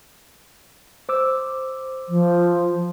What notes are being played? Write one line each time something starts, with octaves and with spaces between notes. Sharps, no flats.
C5 D6 E6
F3